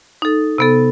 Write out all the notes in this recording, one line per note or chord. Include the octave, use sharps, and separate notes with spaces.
D#4 A4
C3 B3 A4